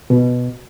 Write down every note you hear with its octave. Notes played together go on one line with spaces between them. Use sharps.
B2